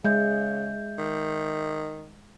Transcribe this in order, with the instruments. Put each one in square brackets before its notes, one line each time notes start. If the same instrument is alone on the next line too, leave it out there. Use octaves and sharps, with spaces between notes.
[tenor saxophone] C#3 [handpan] G#3 [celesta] E5 G6
[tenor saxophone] D#3